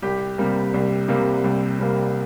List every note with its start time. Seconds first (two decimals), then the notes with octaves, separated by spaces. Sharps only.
0.02 C2 G4
0.38 C3 G3 A#3
0.74 C2
1.08 C3 G3 A#3
1.44 C2
1.80 C3 G3 A#3